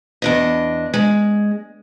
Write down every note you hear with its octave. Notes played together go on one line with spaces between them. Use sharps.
E2 D4 D#5
G#3